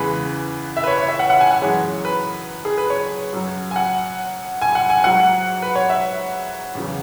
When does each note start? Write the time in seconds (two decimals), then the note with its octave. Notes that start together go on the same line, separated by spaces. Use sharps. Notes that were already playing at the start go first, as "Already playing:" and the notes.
Already playing: E2 C#3 E3 G#3 B4
0.77 E5
0.84 B4
0.87 C#5
0.98 C#5
1.08 E5
1.19 F#5
1.30 F#5
1.40 G#5
1.51 F#5
1.62 F#2 E3 G#3 C#5
2.05 B4
2.65 G#4
2.78 B4
2.90 C#5
3.33 F#2 F#3
3.71 G#5
3.76 F#5
4.62 G#5
4.75 F#5
4.90 G#5
5.04 G#2 F#3 F#5
5.62 B4
5.76 C#5
5.90 E5
6.75 E2 C#3 F#3